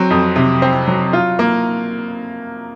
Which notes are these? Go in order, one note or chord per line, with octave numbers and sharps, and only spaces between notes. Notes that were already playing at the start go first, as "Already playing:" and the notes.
Already playing: F#3 C4
F2
C3
C4
F#3
F4
A#3